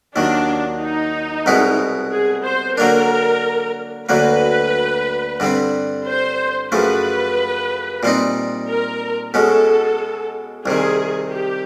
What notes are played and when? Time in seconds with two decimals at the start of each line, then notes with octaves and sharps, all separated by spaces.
0.15 D#2 D#3 F#3 D4
0.81 D#4
1.46 C2 B2 G#3 B3 E4
2.13 G#4
2.45 C5
2.77 D3 F#3 A#3 D4 A#4
4.09 D2 D3 F#3 A#3 B4
5.40 G2 D3 G3 C4
6.07 C5
6.72 F#2 C#3 F3 A3 B4
8.03 A#2 G3 C4 D#4
8.69 A#4
9.34 B2 G#3 C#4 A4
10.65 C2 C3 D#3 G#4
11.32 G4